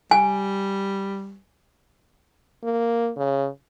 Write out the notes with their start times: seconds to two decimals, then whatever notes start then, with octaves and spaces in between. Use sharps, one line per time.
0.11 G3 G#5
2.64 A#3
3.17 C#3